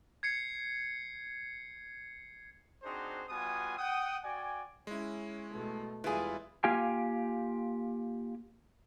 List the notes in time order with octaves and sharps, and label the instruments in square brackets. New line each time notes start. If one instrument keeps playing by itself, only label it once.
[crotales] G#6 C7 C#7
[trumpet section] C4 D4 D#4 F#4 G#4 C5
G3 B3 F4 F#4 G#5 D#6
F#5 G5 D#6
F#4 D5 G5 G#5
[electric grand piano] G#3 E4 [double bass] C#4
[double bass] B2 A3
[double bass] E2 G#3 [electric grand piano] G3 F4 B4 [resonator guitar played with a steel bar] E4 G#4
[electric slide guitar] A#3 F4 G4 F5 G5 G#5